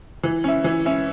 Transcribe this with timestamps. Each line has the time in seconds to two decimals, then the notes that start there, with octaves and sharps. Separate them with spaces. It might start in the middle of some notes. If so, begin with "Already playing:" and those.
0.24 E3
0.44 C#4 E4
0.64 E3
0.86 C#4 E4